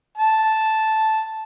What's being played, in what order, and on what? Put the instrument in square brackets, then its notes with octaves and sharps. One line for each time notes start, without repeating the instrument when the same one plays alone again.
[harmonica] A5